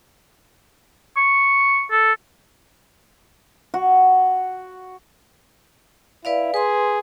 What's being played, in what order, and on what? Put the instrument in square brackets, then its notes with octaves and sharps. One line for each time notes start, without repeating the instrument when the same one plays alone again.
[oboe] C#6
A4
[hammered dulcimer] F#4
[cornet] E4 [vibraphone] B4 D5 F5
[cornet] G#4 [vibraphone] B4 C6